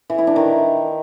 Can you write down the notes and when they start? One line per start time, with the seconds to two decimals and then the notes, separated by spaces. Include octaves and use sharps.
0.10 E3
0.18 E4
0.27 D4
0.36 D#3